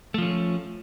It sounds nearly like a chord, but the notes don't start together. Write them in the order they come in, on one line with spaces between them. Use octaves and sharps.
A3 F3 C#4